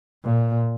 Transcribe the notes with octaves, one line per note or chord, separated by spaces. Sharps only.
A#2